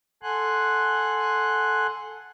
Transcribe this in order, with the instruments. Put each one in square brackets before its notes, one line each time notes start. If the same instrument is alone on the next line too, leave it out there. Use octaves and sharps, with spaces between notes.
[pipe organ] A4 F#5 G#5 C6 F#6